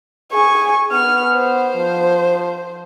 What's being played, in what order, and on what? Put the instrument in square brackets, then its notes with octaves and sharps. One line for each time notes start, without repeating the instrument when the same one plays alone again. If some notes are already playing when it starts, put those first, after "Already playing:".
[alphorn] G#4 [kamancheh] G#5 C#6
[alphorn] B3 [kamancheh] F6
[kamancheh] C5
[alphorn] F3